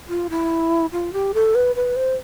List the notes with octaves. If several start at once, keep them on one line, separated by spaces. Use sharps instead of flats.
F4
E4
F4
G4
A4
B4
B4
C5